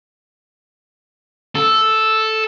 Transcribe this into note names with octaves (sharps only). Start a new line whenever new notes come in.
A4